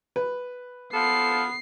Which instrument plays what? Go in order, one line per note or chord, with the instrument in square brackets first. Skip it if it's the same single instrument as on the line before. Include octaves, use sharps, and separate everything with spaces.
[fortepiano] B4
[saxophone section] F3 F4 A4 [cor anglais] B3 [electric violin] C7